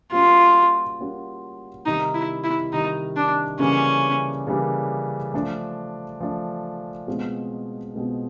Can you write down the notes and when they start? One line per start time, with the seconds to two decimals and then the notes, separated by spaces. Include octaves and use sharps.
0.12 G3 A#3 C#4 F4 F#4
0.99 G3 A#3 C#4 F#4
1.86 C3 D#3 G3 D#4
2.15 E4
2.44 E4
2.73 C3 D#3 G3 D#4
3.16 D4
3.59 C#3 E3 G3 A#3 C#4 D4
4.47 C#3 E3 G3 A#3 D4
5.33 F3 A3 D4
6.20 F3 A3 D4
7.07 B2 G#3 C4 F4
7.94 B2 G#3 C4 F4